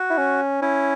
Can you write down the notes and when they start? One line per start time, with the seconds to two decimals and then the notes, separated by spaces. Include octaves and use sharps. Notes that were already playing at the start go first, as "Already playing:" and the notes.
Already playing: F#4
0.10 E4
0.18 C#4
0.62 C#4 E4